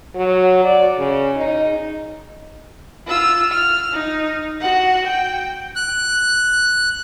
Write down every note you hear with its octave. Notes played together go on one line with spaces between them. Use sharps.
F#3
D5
C#3
D#4
F4 E6
F6
D#4
F#4 F#5
G5
F#6